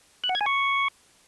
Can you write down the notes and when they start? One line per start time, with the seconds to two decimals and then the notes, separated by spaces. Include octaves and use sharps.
0.24 F#6
0.29 F#5
0.35 G#6
0.41 G#5
0.46 C#6